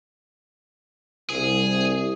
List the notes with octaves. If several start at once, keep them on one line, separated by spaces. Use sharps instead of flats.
C2 G#4